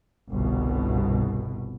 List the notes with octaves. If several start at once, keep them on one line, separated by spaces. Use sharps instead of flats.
G1 C2 B2